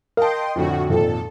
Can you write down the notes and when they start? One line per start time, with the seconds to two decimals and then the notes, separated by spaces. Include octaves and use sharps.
0.17 A#4 D#5 F5 G5 A5 C6
0.55 F2 A2 D3 F#4
0.89 G#1 F2 A#2 A4